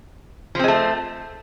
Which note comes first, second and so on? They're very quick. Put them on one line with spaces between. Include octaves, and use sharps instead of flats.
F3 C4 G#3 A3